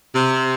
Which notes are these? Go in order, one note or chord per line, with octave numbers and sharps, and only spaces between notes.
C3